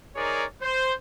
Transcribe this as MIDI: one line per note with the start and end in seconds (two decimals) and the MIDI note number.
0.16 0.45 63
0.16 0.45 68
0.16 0.45 70
0.16 0.45 73
0.16 0.45 74
0.62 0.93 72